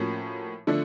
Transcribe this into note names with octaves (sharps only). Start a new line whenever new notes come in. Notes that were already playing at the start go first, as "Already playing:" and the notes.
Already playing: A2 F3 A#3 C#4 F#4
D3 F3 A3 D4